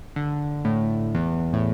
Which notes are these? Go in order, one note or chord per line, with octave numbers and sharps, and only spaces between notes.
D3
A2
E2
A2